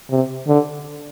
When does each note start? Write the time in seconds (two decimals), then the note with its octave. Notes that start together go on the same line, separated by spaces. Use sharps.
0.10 C3
0.48 D3